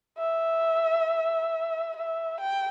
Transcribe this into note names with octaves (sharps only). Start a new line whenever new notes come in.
E5
E5
G5